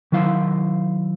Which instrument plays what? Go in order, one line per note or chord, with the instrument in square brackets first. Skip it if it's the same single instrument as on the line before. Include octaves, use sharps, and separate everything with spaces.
[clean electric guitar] D#3 F#3 E4 F5